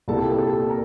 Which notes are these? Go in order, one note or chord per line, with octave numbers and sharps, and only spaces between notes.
C2 A#2 G3 A#3 A4 A5
A4 A5
A#4 A#5